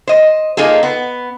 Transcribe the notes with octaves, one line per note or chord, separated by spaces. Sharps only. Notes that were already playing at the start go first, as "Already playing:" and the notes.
C5 D#5
A#3 D#4 F4 G#4 A4
B3